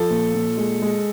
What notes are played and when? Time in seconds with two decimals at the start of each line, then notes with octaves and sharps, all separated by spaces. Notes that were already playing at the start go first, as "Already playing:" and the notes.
Already playing: F3 A4
0.10 A#2
0.35 A#2
0.57 G#3
0.82 G#3